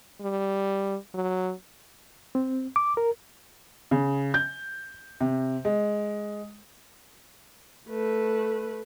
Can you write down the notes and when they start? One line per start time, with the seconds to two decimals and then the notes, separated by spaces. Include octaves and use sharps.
0.21 G3
1.14 F#3
2.35 C4
2.76 D6
2.97 A#4
3.91 C#3
4.34 G6
5.21 C3
5.65 G#3
7.88 A3 B4